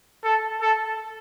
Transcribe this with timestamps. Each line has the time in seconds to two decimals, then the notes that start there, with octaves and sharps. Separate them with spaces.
0.24 A4
0.61 A4